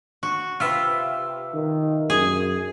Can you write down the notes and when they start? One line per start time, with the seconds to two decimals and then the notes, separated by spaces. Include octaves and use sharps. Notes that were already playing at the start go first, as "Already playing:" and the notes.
0.23 F#4
0.60 C3 F4 B4 E5 F5
1.54 D#3
2.10 F#2 G#4